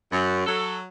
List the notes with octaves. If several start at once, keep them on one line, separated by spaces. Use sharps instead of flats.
F#2
F#3 A4